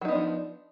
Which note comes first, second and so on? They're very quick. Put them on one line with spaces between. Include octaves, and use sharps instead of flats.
F#3 D#4 B3 D4 F3